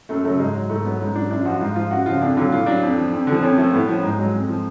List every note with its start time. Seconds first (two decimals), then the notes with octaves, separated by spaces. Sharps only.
0.09 F#2 A3
0.24 C#3 F#3 A3
0.39 G#2 G#3
0.54 F#3
0.69 G#2 A3
0.85 F#3 B3
1.00 G#2 C#4
1.15 F#3 D4
1.31 F#2 D4
1.41 F4
1.45 F3 F#4
1.61 G#2 F4
1.76 F3 F4
1.91 F#2 F#4
2.06 C#3 F3 F4
2.21 F2 D4
2.37 D3 F#3 F4
2.52 A2 F4
2.66 F#3 D4
2.82 F2
2.98 F3
3.13 F2
3.27 D3
3.32 F3
3.43 F2 C#4
3.58 F3 A3
3.73 A2 B3
3.89 F3 C#4
4.03 G#2 G#3
4.18 F#3 G#3
4.34 F2
4.49 F3